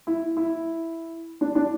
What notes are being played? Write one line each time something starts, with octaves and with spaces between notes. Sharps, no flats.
E4
E4
D4
D4